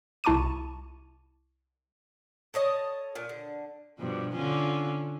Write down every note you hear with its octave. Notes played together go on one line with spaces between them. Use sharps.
C2 E4 A5 C#6 D6 D#7
A4 C#5 D#5 A5
A#2
D3
G2 B2 F3
D3 C#4 F4